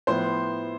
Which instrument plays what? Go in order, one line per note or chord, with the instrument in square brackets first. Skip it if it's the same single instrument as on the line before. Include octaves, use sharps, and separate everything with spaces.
[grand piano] A2 F3 B3 [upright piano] C5 C6